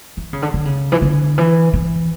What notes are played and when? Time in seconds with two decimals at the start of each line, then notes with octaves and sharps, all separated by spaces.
0.17 E3
0.33 C#3
0.42 D3
0.54 D3
0.65 C#3
0.92 E3
1.02 D3
1.38 E3
1.73 E3